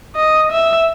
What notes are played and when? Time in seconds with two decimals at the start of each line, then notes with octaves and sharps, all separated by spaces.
0.16 D#5
0.51 E5